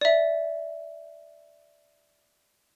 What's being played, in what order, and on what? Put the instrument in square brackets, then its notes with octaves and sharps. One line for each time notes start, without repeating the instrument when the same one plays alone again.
[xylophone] D5 E5